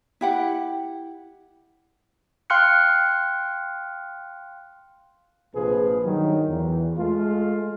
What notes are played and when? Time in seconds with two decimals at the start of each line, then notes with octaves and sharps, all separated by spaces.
0.21 E4 G4 F#5
2.50 F5 G5 C6 F6 F#6 C#7
5.55 A#1 C3 F3 G#4 B4
6.04 G2 D#3 F#3
6.49 E2
6.97 G#3 A3 F4